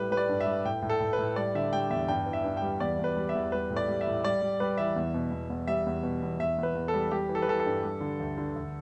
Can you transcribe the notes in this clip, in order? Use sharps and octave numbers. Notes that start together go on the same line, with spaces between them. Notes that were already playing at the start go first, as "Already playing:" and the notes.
Already playing: A2 G3 B4
G3 B4
D5
G2
E5
G3
A2 G5
A2
A4
A2
B4
A2
G3 D5
D3 E5
G3 G5
E2 E5
G2 G5
E3
E5
G2
G3 G5
E2 D5
E2
B4
G3
E5
E2
G3 B4
A2
D5
G3
E5
A2
G3 D5
G3
G3 B4
E3 E5
E2
B2
E2
E2
G3 E5
E2
B2
E2
E2 E5
E2 B4
E2
A4
G3
G3 G4
E3
A4
B4
E3 A4
A4
G2
G3
D3
D2
D3
D2